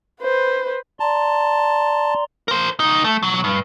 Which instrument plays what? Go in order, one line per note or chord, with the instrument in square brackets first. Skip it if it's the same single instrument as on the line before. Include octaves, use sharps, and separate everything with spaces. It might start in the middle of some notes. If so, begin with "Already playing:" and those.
[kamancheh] B4 C5
[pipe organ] D5 A#5 C6 [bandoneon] A5
[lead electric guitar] A#4 C5
C#2 D#4
A3
B2 F#3
G2